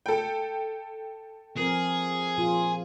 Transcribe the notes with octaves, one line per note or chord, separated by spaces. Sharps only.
A4 G5
F3 C4 G#4 A#4
A#2 F3 F4